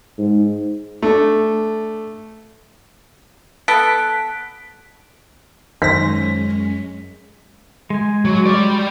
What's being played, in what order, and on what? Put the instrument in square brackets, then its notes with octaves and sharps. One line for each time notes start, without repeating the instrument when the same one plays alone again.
[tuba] G#2
[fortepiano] A3 D4
[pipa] B3 A4 [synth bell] F#6 B6 D7
[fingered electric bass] F#2 [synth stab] D#3 C5 A#6 [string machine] G#3 C#4 [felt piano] B6
[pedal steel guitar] G#3 G#5
[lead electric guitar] F#3
G3 D5